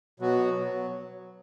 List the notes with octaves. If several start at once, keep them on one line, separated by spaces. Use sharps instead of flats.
B2 F#3 B3 F#4
F#3